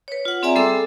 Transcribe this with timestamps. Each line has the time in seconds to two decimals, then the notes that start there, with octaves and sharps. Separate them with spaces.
0.08 B4 C#5
0.25 F4 F#5
0.43 C4 G#4 D5 E5 G#5 A#5
0.56 G3 B3 G#4 A4 D6 E6
0.69 A4